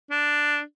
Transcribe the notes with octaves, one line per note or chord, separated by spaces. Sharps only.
D4